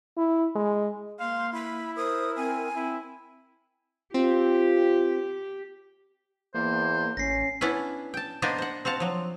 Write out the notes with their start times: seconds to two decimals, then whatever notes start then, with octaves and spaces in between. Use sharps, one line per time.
0.17 E4
0.56 G#3
1.20 A#3 F5 C6
1.53 E4 B5
1.96 A#4 C5 D#6
2.36 C4 G#5
2.76 C4 E4
4.14 C4 F4 G4
6.55 E2 A#3 C5
7.17 A1 C#4 A#6 C7
7.61 B3 C#4 D4 E4 B4
8.14 G5 A5
8.42 A#3 B3 D4 C5 D#5
8.58 C5 F#5
8.85 C4 F#4 F5 A5
9.00 F3 F#3